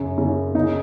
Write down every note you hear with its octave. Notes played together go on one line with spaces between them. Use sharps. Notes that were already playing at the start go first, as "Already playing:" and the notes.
Already playing: F#2 C#3
C#3
C#3 D#4